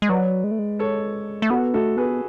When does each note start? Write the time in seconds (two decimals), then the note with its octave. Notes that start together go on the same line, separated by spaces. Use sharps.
0.02 G#3
0.08 F#3 B4 D5
0.44 G#3
0.51 A3
0.59 G#3
0.79 A4 C#5
1.42 A3
1.50 B3 F#4 A4
1.74 A3 F#4 A4
1.97 B3 G#4 B4